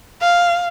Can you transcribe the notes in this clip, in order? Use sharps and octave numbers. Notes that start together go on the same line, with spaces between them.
F5